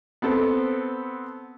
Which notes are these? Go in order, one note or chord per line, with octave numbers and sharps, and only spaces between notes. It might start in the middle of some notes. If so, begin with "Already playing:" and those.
B3 C4 A4